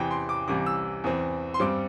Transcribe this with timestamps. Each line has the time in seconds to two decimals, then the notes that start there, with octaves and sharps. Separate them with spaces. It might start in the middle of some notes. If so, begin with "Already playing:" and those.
Already playing: E2 C3 E3 G5
0.11 C6
0.29 D6
0.48 C2 C3 E3 D6
0.66 E6
1.04 E2 E3 C4
1.54 C6
1.60 G2 G3 C4 D6